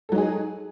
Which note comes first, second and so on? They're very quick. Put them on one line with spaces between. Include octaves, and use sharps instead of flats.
A4 F#3 D#4 G#4